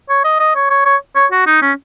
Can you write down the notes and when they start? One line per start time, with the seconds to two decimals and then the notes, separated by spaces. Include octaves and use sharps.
0.09 C#5
0.24 D#5
0.40 D#5
0.55 C#5
0.70 C#5
0.85 C#5
1.16 C#5
1.32 F#4
1.47 D#4
1.62 C#4